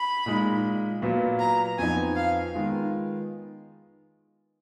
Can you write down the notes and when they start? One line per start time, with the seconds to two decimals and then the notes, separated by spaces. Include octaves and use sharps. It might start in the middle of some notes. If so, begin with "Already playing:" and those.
Already playing: B5
0.26 A#2 G#3 D#4
1.02 A#2 F#3 B3 F4
1.40 A#5
1.79 F2 F3 B3 D#4 G#5
2.16 F5
2.54 D#3 G#3 B3 F4